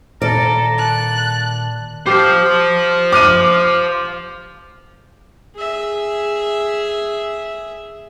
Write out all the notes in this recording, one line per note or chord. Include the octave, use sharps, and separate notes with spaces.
A#2 D#3 A4 D5 A#5
A5 F#6
G4 C5 F5
D6 F6 D#7
G#4 E5